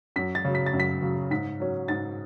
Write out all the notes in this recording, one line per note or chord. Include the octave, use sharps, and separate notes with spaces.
F#2 B6
A6
C#3 F#3
B6
A6
F#2
B6
C#3 F#3
G#2 B6
F#3 C#4
G#2 A6